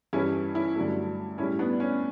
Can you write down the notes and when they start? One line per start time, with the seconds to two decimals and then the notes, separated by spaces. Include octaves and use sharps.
0.13 G2 E3 G3 C#4 E4
0.55 C#4 E4
0.76 G2 D3 F#3 A3
1.38 A2 G3 C#4 E4
1.59 B3 D4
1.80 C#4